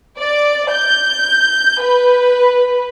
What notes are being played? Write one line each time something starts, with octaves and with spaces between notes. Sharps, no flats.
D5
G6
B4